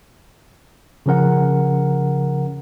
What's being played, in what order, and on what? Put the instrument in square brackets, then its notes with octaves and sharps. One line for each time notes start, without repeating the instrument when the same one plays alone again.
[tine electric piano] C#3 F3 C#4 A#4 F#5